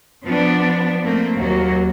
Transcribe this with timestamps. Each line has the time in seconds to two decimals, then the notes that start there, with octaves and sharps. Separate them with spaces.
0.23 F3 B3 D4
1.05 A3 A#3 C4
1.34 D#2 F#3 A#3 F#4